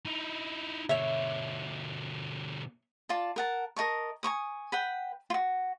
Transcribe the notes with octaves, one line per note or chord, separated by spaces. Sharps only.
D#4 E4
B2 D3 C#5 E5
F4 D5 A5
A#4 F#5 A5
A#4 D#5 A5 C#6
G#5 A#5 C#6 D#6
B4 F#5 G5
F4 F#4